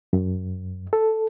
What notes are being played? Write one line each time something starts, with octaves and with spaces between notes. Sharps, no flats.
F#2
A4